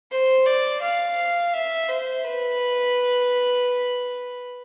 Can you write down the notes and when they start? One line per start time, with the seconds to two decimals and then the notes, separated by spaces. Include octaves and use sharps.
0.11 C5
0.46 D5
0.82 F5
1.54 E5
1.88 C5
2.24 B4